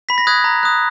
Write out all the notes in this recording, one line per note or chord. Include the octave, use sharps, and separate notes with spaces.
B5 B6
A#6
D#6 F#6 G#6
A#5
D#6 F#6